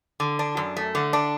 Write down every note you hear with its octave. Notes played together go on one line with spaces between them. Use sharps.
D3
D4
F#2
A3
D3
D4